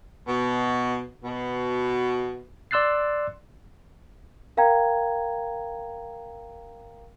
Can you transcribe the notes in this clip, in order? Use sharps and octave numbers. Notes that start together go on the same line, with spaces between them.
B2
B2
D5 C6 E6 F#6 A6 C7
A#4 F5 G5 A#5 G#6